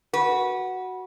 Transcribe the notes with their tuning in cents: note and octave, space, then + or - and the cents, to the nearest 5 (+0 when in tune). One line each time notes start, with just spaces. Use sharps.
F#4 +5 B4 -25